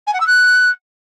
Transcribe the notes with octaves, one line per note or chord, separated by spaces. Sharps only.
G#5
F#5
E6
F#6